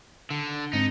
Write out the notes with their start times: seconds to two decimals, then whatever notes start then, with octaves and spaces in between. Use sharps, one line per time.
0.30 D3
0.73 G#2 C4 D#4 C#7